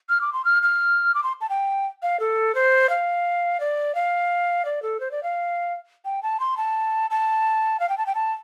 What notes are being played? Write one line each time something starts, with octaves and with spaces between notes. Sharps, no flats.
F6
D6
C6
F6
F6
D6
C6
A5
G5
F5
A4
C5
F5
D5
F5
D5
A4
C5
D5
F5
G5
A5
C6
A5
A5
F5
G5
A5
G5
A5